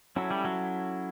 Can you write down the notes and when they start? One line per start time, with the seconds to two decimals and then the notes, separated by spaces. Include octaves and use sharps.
0.16 F#3 C#4 E4 A4 E5
0.31 G3
0.45 F#3